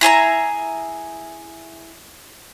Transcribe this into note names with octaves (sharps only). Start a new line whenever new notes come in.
E4 G#4 E5 A#5